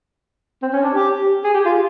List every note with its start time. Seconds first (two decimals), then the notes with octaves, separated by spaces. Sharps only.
0.63 C4
0.73 C#4
0.83 D4
0.94 G4
1.44 G#4
1.54 G4
1.65 F4